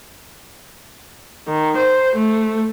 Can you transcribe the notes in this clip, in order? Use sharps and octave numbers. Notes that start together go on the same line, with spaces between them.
D#3
C5
A3